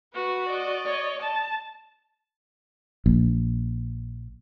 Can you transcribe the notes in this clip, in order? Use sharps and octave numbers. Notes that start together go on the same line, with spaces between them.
F#4 B4
D5 D#5
C#5
A5
A#1